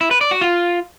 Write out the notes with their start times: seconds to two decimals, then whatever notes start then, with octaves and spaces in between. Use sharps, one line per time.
0.01 E4
0.11 B4
0.21 D5
0.31 F#4
0.41 F4